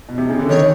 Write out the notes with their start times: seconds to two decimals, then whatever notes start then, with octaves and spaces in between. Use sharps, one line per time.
0.09 B2
0.18 C3
0.30 C#3
0.39 D3
0.49 D#3 C#5